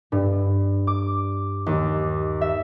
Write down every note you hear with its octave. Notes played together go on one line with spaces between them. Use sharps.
G2
D6
D#2
E5